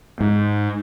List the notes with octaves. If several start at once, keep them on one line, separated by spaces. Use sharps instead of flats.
G#2